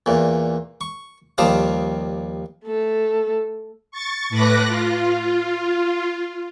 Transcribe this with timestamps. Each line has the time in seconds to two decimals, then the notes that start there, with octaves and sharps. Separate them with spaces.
0.06 E2 A#2
0.81 C#6
1.38 D#2 F3 G3 F5 A5 D#6
2.65 A3 A4
3.91 C#6 A6
4.29 A2 A3 B4 D6 F#6 A#6
4.67 F4